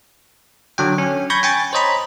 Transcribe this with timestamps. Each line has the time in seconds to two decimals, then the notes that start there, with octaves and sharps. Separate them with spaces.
0.78 D3 F#3 G5
0.98 C#4
1.30 B5 C#6 G6 G#6 A#6
1.43 G5 G#5 C#6 A6
1.73 C5 C#5 D#5 A#5 B5